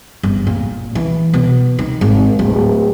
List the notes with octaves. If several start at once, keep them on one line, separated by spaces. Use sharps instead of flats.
G1
A#2
E3
B2
D#3
G#1
D1